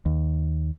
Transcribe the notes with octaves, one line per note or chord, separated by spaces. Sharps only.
D#2